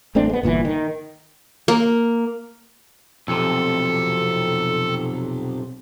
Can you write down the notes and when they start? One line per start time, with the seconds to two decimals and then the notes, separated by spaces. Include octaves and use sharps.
0.15 A1 A3 C4 D4
0.29 G#3 B3
0.43 G1 A#2 D3 E3
0.65 D#3
1.68 A#3
3.28 B1 F2 C3 A4